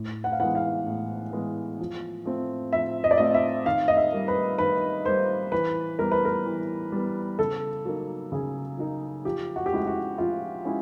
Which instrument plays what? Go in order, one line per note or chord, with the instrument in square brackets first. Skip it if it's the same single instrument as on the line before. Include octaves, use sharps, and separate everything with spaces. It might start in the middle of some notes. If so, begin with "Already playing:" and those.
Already playing: [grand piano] A2
[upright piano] F#5
F5
[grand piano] E3 G#3 B3 [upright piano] F#5
[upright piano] F5
[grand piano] A2
E3 G#3 B3
F3
A3 C4 F4
[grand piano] F3 [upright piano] E5
[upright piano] D#5
D5
[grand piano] A3 C4 F4 [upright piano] D#5
[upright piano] E5
[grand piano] D#3 [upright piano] F5
[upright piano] D#5
E5
[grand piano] G3 A#3
[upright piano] B4
[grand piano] D#3 [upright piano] B4
[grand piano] G3 A#3 [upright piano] C5
[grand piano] E3 [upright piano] B4
[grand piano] G3 B3 [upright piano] A#4
[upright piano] B4
A#4
[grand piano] E3
G3 B3
[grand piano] C#3 [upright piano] A4
[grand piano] F#3 A#3 D#4
[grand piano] C#3 [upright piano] G#4
[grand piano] F#3 A#3 D#4
[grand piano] F3 [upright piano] G4
[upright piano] F#4
G4
[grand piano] G#3 C#4 E4 [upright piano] F#4
[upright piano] F#4
[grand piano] F3 [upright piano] F4
[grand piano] G#3 C#4 E4